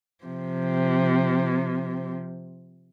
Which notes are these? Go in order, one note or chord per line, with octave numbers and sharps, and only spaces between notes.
C3 F3